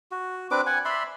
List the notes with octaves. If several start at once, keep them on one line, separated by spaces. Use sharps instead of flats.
F#4
C4 D4 B4 D6
F#5 G#5
D5 E5 B5 C6